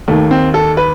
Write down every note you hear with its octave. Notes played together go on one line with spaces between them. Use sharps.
D#2 D#3 A3
C4
A4
B4